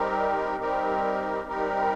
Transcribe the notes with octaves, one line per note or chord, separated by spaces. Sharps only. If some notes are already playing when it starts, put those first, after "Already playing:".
Already playing: G3 C4 D#4 G4 A#4
G3 C4 D#4 G4 A#4
G3 C4 D#4 G4 A#4